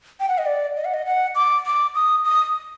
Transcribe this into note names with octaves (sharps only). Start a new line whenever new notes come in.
G5
F#5
D#5
D5
D#5
F#5
D#5
F#5
D6
D6
D#6
D#6